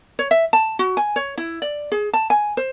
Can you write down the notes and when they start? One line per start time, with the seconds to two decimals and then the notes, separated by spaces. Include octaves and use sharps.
0.19 C#5
0.31 E5
0.53 A5
0.79 F#4
0.97 G#5
1.16 C#5
1.38 E4
1.62 D5
1.92 G#4
2.13 A5
2.30 G#5
2.57 C5